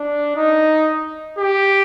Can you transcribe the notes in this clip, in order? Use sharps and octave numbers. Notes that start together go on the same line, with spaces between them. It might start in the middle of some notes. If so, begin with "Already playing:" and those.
Already playing: D4
D#4
G4